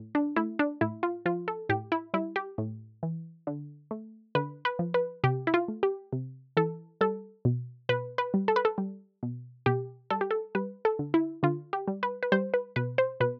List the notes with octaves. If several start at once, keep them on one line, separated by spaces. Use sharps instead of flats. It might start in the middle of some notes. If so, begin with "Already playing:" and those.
Already playing: A2
D4
A3 E4
D4
A2 E4
F4
F3 F4
A4
A2 G4
E4
G3 E4
G4
A2
E3
D3
A3
D3 B4
B4
F3
B4
C3 G4
E4
F4
A3
G4
C3
E3 A4
G3 A4
B2
B2 B4
B4
G3
A4
B4
A4
G3
B2
B2 G4
G3 A4
G4
A4
G3 B4
A4
D3
E4
D3 F4
G4
G3
B4
B4
G3 C5
B4
B2 B4
C5
B2 B4